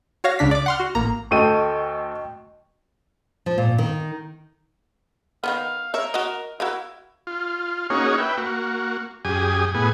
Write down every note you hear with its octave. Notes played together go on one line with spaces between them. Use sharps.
F#4 C#5 F5 A#6
C#2 C#3 D4 B6
D5 D6
F#5 C6 F6
F#4
A1 A#3 A#5
D2 A4 D#5 G5 C#6 D#7
F3
A#2
D#3
D#3 F3 B3 F5
A#4 C#5 E5
F#4 D#5
E4 F#4 A#4 F5
F4
A#3 C#4 D#4 F#4 G#4 C#5
B4 E5 G5
A#3 F#4
F#2 G4 G#4 G#5 D#6
A2 B3 G#4 G#5